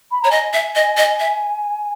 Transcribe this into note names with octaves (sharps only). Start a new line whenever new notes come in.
B5
C#5 A#5
D#5 G#5
E5
D#5
D#5
E5